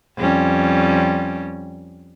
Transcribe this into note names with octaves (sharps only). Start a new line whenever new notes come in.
F2 G3 C#4